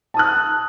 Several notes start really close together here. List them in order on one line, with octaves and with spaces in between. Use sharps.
A5 D#6 F#6